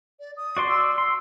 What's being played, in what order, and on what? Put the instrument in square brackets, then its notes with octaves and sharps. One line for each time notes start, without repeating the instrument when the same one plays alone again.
[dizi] D5
D#6
[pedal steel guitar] F#4 D5 C6
[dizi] E6
[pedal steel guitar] C6